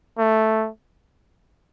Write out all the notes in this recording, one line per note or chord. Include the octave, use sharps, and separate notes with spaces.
A3